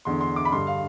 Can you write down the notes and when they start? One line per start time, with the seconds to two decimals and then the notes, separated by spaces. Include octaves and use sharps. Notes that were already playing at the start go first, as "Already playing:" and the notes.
0.05 E2 D3 C6
0.21 C6
0.36 D6
0.45 B5
0.51 G2 D3 C6
0.67 F5